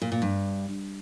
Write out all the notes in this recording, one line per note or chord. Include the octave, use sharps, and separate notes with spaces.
A#2
A#2
G2